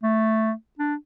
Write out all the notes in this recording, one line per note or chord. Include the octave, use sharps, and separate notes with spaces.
A3
D4